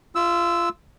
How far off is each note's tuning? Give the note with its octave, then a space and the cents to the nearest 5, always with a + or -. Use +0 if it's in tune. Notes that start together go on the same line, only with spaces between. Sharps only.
F4 -20 E6 +0